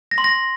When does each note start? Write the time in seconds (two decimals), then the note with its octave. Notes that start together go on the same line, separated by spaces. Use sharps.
0.11 A#6
0.18 C6
0.24 A#6